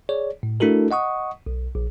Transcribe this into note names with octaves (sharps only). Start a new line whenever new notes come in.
G#4 C#5 D5
A2
A3 D4 E4 F#4 A4 A#4
D#5 F#5 C#6 D#6
B1
A#1